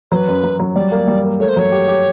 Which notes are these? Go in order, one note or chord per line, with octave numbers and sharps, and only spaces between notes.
F#3 B4 C5
F#2
F#3
F#3
G3 D5
A#3
G3
A#3
A3 C#5
C5
F#3 C#5
G4
G4